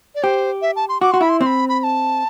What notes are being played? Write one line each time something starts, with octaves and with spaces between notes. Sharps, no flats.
D5
G4 C5
E5
A5
C6
F#4 D6
F#4 C6
E4 B5
C6
C4 C6
B5
B5
B5
A5